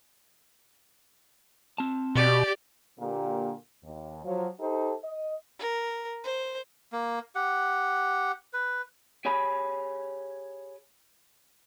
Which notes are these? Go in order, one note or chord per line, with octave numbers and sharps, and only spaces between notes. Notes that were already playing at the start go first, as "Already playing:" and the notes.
C4 A5
B2 G4 D5
A#2 D3 A#3 G4
D#2
F3 F#3
D#4 G4 A4 C5
D#5
A#4
C5
A#3
G4 F#5
B4
G4 G#4 C#5 G#5 B5